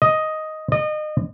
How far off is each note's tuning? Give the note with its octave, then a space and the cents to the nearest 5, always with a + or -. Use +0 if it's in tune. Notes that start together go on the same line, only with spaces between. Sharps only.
D#5 +5
D#5 -30